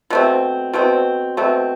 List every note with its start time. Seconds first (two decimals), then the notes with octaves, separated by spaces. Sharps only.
0.10 B2 A3 C4
0.73 B2 A3 C4
1.37 B2 A3 C4